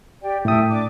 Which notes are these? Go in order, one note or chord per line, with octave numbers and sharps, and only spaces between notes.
G4 D5 G5
A2 A4 E5 G5 D#6
D4 D6